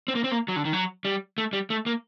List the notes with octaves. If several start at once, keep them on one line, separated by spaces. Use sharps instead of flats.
C4
A#3
C4
A#3
F#3
D3
D#3
F#3
G3
A3
G3
A3
A#3